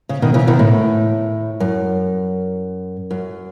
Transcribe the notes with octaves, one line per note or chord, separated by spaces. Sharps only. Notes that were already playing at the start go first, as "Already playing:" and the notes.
C#3
B2 D#3
C#3 E3
B2 D#3
A2
F#2
F#2